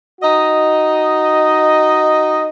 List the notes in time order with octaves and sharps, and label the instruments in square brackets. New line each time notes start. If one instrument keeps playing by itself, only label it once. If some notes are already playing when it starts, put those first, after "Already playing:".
[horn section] D#4 F#4 D#5